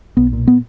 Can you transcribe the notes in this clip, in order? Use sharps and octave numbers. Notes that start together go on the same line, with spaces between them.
B1 B3
A#2
B3